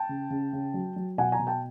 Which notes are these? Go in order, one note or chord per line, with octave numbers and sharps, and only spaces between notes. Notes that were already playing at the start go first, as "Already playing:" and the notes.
Already playing: G5 A5
C#3
C#3
C#3
F#3
F#3
B2 F#5 G#5
G#5 A#5
B2
G5 A5